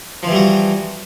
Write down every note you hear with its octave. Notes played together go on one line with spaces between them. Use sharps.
E3 F3 G3 F#4